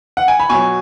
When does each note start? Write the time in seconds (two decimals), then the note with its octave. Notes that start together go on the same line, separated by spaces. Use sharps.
0.17 F#5
0.28 G#5
0.40 B5
0.49 B2 F#3 G#5 C#6